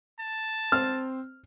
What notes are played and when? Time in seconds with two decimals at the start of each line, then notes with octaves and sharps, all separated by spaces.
0.19 A5
0.72 C4 C5 F6